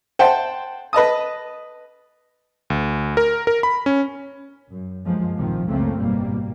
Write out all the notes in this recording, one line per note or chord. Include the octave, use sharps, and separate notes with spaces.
C5 F#5 G5 A5
B4 D#5 A5 D#6
D2
A#4
A#4
B5
C#4
F#2
D2 G2 F3 G#3 A#3
A#1 G#2 C3 D#3 F3
C#2 F#2 C#3 A3 A#3 C4
G#1 B2 G3 A#3